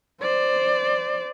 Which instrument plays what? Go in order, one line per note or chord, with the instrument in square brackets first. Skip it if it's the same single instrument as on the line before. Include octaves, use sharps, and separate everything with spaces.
[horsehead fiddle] C5 D5